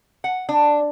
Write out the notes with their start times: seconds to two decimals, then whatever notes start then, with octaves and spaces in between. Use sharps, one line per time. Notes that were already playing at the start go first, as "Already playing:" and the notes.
0.24 F#5
0.49 D4